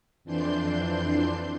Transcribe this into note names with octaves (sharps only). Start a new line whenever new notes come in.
F2 E3 D4 C6 G6